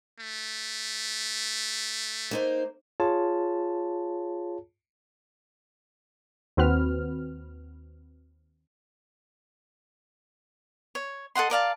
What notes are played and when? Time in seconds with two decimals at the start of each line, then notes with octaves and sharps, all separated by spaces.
0.19 A3
2.31 A#3 D#4 C5
3.00 F4 G#4 C#5 A5
6.57 D#2 C4 F#4 B4 F6
10.95 C#5
11.35 A4 D#5 F#5 C6
11.50 A#4 D5 F5 A5